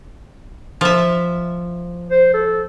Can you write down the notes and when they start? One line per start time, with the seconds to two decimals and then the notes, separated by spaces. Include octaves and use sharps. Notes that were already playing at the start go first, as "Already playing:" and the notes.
0.81 F3 E5
2.10 C5
2.33 A4